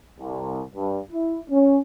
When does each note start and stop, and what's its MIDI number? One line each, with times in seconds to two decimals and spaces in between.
0.18 0.61 36
0.75 0.98 43
1.10 1.39 64
1.49 1.77 61